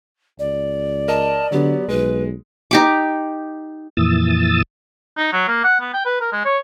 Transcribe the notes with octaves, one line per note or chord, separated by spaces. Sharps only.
C#2 D5
A#4 D#5 A5
D3 F#3 B3 G4
B1 G#3 B4
D#4 G4 D6
F2 A#2 E3 D#6 E6 A6
D#4
F#3
A#3
F#5
B3
G5
B4
A#4
G#3
C#5